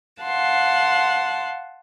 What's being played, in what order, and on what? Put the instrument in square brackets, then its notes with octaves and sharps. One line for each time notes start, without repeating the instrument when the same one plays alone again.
[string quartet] F5 F#5 A5 C6